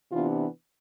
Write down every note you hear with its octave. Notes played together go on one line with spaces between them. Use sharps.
C3 E3 B3 D4 F4